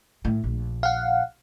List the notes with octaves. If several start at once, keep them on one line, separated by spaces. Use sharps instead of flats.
A2
A#1
F5 F#5